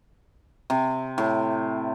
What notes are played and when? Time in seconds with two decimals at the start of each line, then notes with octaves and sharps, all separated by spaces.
0.70 C3
1.18 A2